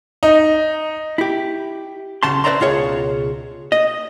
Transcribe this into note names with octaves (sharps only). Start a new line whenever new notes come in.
D#4
E4 G4
B1 C#3 A5 C6
B4 C5 D5 E5 A#5 C6
C#2 B2 F4 G#4 C#5
D#5